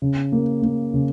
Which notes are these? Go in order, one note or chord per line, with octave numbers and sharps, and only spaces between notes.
C#3
A#3
A#3
C#3